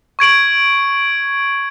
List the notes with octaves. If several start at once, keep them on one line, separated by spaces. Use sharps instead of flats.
C#6 G#6 D7 F#7